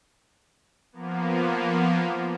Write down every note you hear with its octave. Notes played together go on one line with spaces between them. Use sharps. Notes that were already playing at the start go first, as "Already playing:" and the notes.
F3 A#3 B3